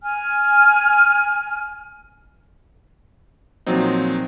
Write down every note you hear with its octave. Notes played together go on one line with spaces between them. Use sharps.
G#5 F6
A#2 F3 F#3 C4 D#4